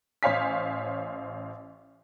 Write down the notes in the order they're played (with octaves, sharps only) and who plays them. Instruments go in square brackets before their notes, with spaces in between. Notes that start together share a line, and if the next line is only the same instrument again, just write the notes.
[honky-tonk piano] A1 C5 C#5 F5 G#5 B6